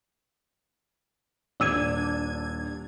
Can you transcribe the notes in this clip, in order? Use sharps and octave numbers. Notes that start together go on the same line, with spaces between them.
D#1 D4 E6 G#6 D#7